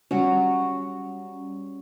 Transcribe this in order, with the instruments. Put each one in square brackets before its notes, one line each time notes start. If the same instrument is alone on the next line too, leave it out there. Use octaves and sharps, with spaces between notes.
[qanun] F#3 F#4 [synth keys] G3 C#4